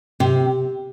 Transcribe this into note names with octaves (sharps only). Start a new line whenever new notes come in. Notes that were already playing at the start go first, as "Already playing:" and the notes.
C3